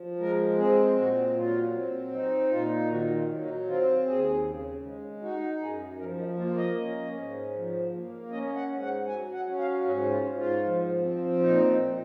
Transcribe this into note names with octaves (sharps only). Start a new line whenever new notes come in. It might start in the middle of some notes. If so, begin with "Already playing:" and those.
Already playing: F3
G#3 A#4
C4 G#4
A#2 F#4
F#3 F4
C4
D#4
A#2 F4
D#3 F#4
F4
F#3
D#4
C4 F4
D#2 G#4
C#3
G#3
D#4 F#4
F#2 G#4
F3 A#4
D#4
A#3 F4
D#5
C#4
G#2
F3
A#3
C#4 D#5
F#5
G#2
F#5
F#3 G#5
F#5
C#4
F5
G#2 F#4
F4
G#2
F4
F3
C4
A#2 D#4
A#2